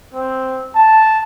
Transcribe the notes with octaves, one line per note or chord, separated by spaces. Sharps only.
C4
A5